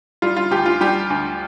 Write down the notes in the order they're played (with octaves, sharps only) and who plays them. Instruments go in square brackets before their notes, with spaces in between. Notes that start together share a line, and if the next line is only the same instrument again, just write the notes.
[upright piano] G3 F4
F4
D2 G4
F4
G3 G4
D2